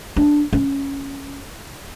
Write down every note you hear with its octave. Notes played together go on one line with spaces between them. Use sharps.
D4
C#4